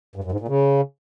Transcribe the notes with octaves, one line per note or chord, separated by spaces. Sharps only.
G2
F#2
G#2
A#2
C#3